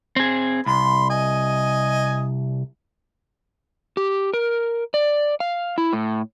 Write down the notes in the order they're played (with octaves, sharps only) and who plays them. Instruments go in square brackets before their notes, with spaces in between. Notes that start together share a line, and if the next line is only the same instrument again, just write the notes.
[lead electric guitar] C4 G#4
[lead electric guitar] C2 [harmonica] B5 C6
[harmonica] D#5 G#5
[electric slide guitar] G4
A#4
D5
F5
E4
A2